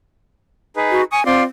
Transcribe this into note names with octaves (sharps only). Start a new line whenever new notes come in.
D#4 G#4 B4
F#4
G#5 C#6 D#6
C4 F4 D5 C6